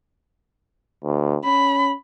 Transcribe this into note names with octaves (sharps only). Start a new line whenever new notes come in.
D2
C#4 B5